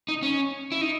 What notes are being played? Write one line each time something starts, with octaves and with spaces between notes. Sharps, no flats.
D#4
C#4
E4
D#4